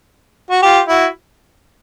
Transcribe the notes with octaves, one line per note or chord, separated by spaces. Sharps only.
F#4
F4 G4
E4 F#4